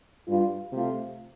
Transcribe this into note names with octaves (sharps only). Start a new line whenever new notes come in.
G2 G3 F4
C3 A3 F4